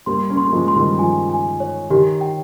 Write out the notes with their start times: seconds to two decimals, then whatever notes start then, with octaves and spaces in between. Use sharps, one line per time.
0.06 G3 A#3 C6
0.30 A#3 C#4
0.37 C6
0.48 A#3
0.52 F3 G#3
0.68 C6
0.76 D#3 G3
0.99 F3 G#5
1.29 G#5
1.60 C#5
1.90 D#3 G4
2.21 G5